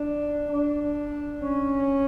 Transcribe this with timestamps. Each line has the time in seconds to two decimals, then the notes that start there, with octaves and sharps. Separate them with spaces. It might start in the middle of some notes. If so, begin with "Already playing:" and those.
Already playing: D4
0.52 D4
1.44 C#4